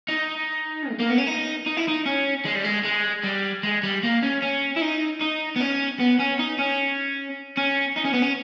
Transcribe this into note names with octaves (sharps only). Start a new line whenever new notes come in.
D#4
G#3
A#3
B3
C#4
D#4
D#4
E4
D#4
C#4
G#3
G3
G#3
G#3
G3
G#3
G3
A#3
C#4
C#4
E4
D#4
D#4
B3
C#4
B3
C#4
D#4
C#4
C#4
D#4
C#4
B3
C#4